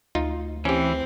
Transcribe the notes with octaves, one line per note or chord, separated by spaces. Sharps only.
D2 D#4 F4
E3 C4 C#4 G4